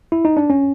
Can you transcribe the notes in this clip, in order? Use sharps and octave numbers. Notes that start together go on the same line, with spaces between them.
E4
D#4
D4
C#4